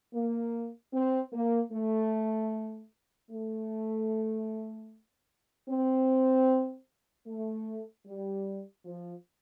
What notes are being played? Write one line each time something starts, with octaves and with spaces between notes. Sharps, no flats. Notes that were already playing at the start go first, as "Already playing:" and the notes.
A#3
C4
A#3
A3
A3
C4
A3
G3
F3